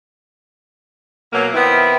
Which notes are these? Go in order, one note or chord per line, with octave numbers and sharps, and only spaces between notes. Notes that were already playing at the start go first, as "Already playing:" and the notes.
B2 F#3 A#3
D#3 B3 C4 E4